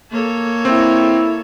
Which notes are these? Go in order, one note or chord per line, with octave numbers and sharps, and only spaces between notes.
A#3 A4 C#5
C4 E4